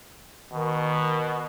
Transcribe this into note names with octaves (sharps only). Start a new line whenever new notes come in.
B2 D#3